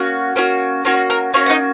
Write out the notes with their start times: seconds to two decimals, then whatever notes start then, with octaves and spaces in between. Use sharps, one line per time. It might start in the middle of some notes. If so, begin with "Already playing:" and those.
Already playing: A#3 C#4 F#4
0.36 A#3 C#4 F#4
0.85 A#3 C#4 F#4 C#5
1.10 A#4
1.34 A#3 C#4 F#4 C#5
1.46 F#5
1.50 D#4 D#5